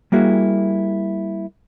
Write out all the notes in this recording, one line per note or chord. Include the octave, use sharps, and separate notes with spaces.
G3 A#3 E4 F#4 G#4